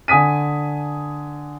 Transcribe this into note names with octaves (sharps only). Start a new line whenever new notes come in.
D3 G#5 D#6 B6 D#7